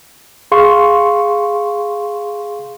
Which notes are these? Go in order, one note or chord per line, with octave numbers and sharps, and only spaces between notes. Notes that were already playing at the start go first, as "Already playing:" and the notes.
G#4 F5 C6 C#6